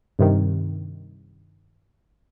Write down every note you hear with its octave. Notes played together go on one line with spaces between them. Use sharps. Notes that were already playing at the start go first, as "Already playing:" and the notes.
G2 C3 D#3